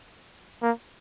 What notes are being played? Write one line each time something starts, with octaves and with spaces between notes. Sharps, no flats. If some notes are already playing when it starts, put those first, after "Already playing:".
A#3